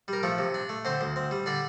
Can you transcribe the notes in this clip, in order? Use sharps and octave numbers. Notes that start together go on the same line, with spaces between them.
G3 A#4
F3 A3 A4
C3
D4
A3
D3 C4 C5
D2
C4
G3
D3 D4 D5